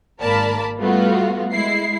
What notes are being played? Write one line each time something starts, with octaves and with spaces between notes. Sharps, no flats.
G#1 A#3 A#4 D5 A5 B5
G3 A3 B3 F4 F#4
G#3 E4 C7